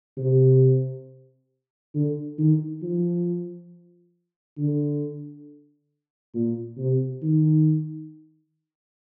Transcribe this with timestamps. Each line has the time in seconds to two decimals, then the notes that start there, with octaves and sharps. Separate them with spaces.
0.17 C3
1.94 D3
2.38 D#3
2.82 F3
4.58 D3
6.35 A#2
6.78 C3
7.22 D#3